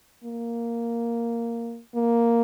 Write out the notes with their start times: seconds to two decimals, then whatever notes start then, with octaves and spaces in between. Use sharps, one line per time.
0.24 A#3
1.96 A#3